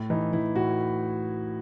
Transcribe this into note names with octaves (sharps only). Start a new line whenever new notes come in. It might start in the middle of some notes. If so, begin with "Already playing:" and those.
Already playing: A2
E3 D#4
E3 E4
A2 F#4